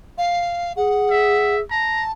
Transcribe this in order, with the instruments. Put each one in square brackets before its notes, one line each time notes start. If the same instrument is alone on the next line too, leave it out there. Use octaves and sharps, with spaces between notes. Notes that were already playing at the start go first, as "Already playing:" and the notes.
[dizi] F5
[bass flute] G#4 [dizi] F#5
[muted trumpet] E5
[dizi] A5 [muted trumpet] A#5